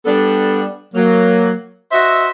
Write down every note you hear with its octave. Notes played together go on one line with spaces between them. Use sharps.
G3 B3 D4 A4
F#3 A#3
F#4 C5 D#5 E5